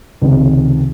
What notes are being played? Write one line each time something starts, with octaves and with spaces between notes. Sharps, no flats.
C#2 C3 D#3